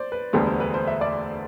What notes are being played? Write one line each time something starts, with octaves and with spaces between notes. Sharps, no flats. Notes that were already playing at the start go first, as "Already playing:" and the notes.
Already playing: C5 D5
B4
E1 D2 D3 G3 B3 C5
C5
B4
C5
E5
D5